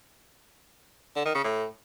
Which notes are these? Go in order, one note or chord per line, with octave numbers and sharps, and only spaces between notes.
D3
D#3
C#3
A2